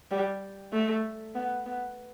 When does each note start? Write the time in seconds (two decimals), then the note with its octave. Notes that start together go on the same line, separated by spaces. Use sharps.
0.11 G3
0.73 A3
1.35 B3
1.66 B3